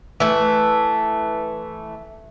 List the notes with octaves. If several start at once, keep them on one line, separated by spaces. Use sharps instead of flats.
E3 A3